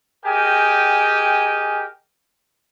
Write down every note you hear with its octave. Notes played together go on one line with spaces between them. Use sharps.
G4 G#4 A#4 D#5 G5 G#5